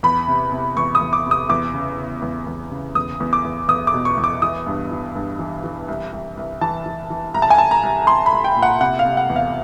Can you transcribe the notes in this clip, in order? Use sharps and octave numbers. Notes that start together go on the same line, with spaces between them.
E2 B5
C3
C3
E2 C#6
D#6
E2
D6
C3
D#6
E2 D6
C#3
C#3
E2
E2
C#3
E2 D#6
E2
D6
E2
E2 D#6
D6
B2
C#6
E2
D6
E3 D#6
G2
E3
G2
E3
E3
C2
C2
C2
E3 A5
E3
E3
C2 A#5
A5
G#5
C2 A5
A#5
C2
C2 C6
B5
C2
G5
A#2
F#5
C3 F#5
F5
C3
F#5
E2
F5